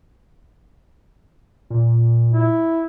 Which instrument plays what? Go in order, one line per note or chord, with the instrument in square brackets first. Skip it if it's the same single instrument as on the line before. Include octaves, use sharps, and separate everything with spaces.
[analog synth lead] A#2
[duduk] E4